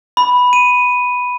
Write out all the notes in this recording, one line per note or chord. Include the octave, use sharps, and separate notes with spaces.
B5
D#7